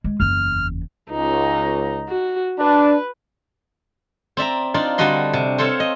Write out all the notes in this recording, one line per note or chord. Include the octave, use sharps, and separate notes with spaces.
G#3
F#1 E2 F6
C#2 D#4
F#4
D4 B4
C4 D5 E5 A#5
D4 D#4 F4 D5
D3 G3 D4 F#4 D#5 C6
C3
C4 A4 C5 C#5 F5
D#5